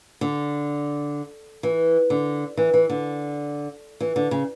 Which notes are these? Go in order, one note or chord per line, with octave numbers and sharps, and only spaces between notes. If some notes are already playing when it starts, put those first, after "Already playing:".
D3
E3
D3
E3
E3
D3
E3
D3
C#3